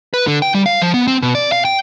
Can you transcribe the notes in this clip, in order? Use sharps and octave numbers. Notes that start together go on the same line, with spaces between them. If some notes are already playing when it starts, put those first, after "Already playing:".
B4
D3
G5
G3
F5
F3
B3
C4
B2
D5
F5
G5